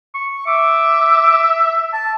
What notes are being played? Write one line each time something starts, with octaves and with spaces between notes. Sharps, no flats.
C#6
E5 D6
A5